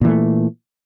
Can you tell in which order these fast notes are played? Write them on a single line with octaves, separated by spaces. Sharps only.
A#2 E3 A3